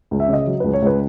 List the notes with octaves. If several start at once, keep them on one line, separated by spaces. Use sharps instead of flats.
C#2
E5
C#3 D#5
F#3
C#2 B4
C#5
C#2 B4